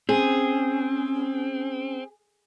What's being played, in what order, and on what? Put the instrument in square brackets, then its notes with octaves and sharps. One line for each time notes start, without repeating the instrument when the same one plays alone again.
[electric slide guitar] C4 [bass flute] C#4 [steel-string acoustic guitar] G#4